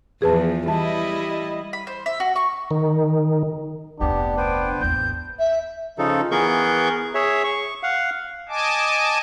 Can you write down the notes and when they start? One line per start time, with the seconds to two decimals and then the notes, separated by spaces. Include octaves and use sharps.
0.22 E2 F3 G#4 B4 A5
0.68 E3 G3 E4 D#5 A5
1.73 B5
1.87 C5
2.06 E5
2.20 F#4
2.36 C#6
2.71 D#3
4.00 F1 D2 B3 D4 G4
4.37 B3 B4 C5 G5
4.80 A1 E2 G6
5.39 E5
5.98 C#3 F3 D#4 A4
6.31 E3 B3 G#4 A#4 C#6 G6
7.14 G#4 C#5 E5
7.44 C#6
7.83 F5 F#5
8.49 D#5 G#5 A5 D6